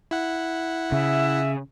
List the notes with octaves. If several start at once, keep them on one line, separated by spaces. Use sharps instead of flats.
E4 F#5
C#3 E5